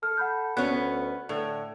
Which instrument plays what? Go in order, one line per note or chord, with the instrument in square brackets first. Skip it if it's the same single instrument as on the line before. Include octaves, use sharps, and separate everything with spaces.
[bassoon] A4 [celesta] F6
[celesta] F#5 B5 G6
[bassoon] D2 [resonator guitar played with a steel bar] B3 C#4 [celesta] B4 F#6
[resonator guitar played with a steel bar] A2 [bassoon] D3